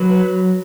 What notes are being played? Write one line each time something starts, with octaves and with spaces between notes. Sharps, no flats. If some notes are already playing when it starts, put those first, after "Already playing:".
Already playing: F#3 B4